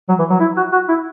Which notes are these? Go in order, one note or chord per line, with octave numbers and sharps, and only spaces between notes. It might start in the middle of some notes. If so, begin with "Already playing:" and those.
F#3
E3
F#3
E4
F#4
F#4
E4